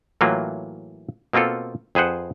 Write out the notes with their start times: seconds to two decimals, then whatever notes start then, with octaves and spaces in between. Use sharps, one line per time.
0.21 A2 E3 F#3 A#3 F4
1.33 B2 A#3 C4 F4 A4
1.95 F2 G#4 B4 C5 F#5